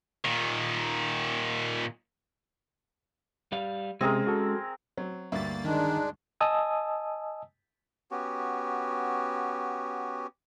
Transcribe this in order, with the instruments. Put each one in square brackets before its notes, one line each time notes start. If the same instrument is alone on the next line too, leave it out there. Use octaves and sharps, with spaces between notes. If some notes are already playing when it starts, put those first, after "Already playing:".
[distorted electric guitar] A#2 D#3
[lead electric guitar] G3 F5
[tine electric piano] C3 [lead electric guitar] G#3 C#4 [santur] C4 G#4 A#4
[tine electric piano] F#4 A4
[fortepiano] F#3 C4
[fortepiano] D2 G2 E5 [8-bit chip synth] A#3 A6
[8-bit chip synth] D#3 [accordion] G#3 D4 [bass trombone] D#4
[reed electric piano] D#5 G#5 A5 D#6 E6
[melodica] B3 C#4 F#4 G4